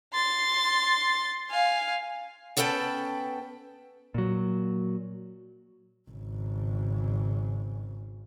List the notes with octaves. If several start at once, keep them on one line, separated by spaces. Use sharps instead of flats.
C6 A6
F5 G#5
B3 C#4 A4 B4 G5 A5
A#2 F#3
G#1 C#3